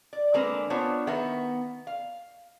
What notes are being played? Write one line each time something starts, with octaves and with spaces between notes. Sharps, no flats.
D5
D3 G#3 A#3 C4 A#4 B4
B3 D4 F4 C5 C#5
D#3 B3 A#4 E5
F5